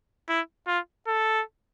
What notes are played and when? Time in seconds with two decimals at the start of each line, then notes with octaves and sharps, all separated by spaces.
0.29 E4
0.67 F4
1.07 A4